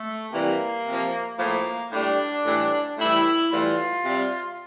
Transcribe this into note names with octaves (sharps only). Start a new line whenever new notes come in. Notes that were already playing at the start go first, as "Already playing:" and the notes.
Already playing: A3
C3 E3 G3 A#3
C3 F3
A2 F3 A#3
A2 G3 D4
A2 E3 G3
A2 E3 G3 E4
A2 E3 G3 F4
C3 G3